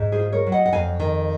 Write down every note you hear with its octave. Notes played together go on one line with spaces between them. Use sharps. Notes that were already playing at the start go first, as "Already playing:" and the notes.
Already playing: G#2
G#4 C5
F4
A#4 C#5
F#3
D#5 F#5
F#5
F2 F5 G#5
D#3